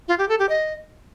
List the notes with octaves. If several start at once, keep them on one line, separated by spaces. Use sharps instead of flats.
F4
G4
A4
G4
D#5